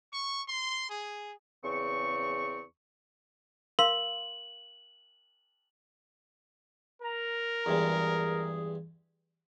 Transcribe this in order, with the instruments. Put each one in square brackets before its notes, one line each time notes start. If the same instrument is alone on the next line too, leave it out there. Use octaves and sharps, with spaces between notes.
[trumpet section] C#6
C6
G#4
[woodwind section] E2 C#3 C4 C#6
[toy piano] A#4 F5 C6 [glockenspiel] F#7
[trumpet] A#4 [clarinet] A#5
[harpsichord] E2 G2 G#3 [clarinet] G#4